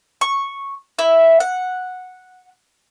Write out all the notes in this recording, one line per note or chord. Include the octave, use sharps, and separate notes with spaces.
C#6
E4
F#5